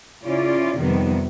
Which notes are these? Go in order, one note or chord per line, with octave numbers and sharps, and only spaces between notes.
C#3 C#4 E4 F4 D5
F2 C3 D#3 G3 B3